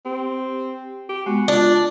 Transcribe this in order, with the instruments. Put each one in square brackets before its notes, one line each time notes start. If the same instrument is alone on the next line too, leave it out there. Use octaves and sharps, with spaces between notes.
[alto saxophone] C4 [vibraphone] G4
[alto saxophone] G4
[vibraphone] G#3 B3 [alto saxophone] F#4
[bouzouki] D4 [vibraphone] F4 [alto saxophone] D5